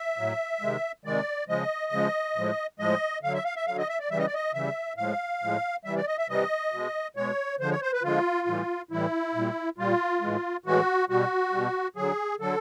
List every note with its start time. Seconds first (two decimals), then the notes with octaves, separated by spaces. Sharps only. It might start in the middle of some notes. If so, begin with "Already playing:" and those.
Already playing: E5
0.18 A2 F#3
0.61 C3 D#3 G#3
1.05 C3 D#3 G#3 D5
1.48 C#3 F3 G#3 D#5
1.92 C#3 F3 G#3
2.36 A2 F3 G#3
2.79 A2 F3 G#3 D#5
3.23 D3 F#3 F5
3.34 E5
3.45 F5
3.56 E5
3.67 D3 F#3 F5
3.78 D#5
3.89 E5
4.00 D5
4.10 C#3 E3 G3 E5
4.18 D#5
4.26 D5
4.34 D#5
4.54 C#3 E3 G3 E5
4.97 A2 F3 G#3 F5
5.42 A2 F3 G#3
5.85 C3 E3 G3 E5
5.96 D5
6.07 D#5
6.18 E5
6.29 C3 E3 G3 D#5
6.72 B2 G#3
7.16 B2 G#3 C#5
7.60 D3 F3 G#3 C5
7.71 C#5
7.82 C5
7.93 B4
8.03 D3 F3 G#3 F4
8.47 A2 E3 G3
8.91 A2 E3 G3 E4
9.35 A#2 G3
9.78 A#2 G3 F4
10.21 A2 E3 G#3
10.65 A2 E3 G#3 F#4
11.09 B2 G3 F#4
11.53 B2 G3
11.96 D3 F#3 G#4
12.40 D3 F#3 A4